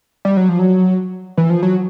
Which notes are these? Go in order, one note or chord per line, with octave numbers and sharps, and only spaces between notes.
G3
F#3
F3
F#3
E3
F3
F#3